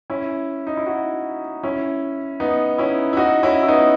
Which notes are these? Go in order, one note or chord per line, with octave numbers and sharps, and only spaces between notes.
C#4 E4
D#4
E4
D#4 F#4
C#4 E4
B3 D#4
C#4 E4
E4
D#4 F#4
C#4 E4
E4
B3 D#4